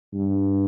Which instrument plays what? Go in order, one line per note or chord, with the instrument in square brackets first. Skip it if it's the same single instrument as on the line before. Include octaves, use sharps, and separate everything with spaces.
[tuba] G2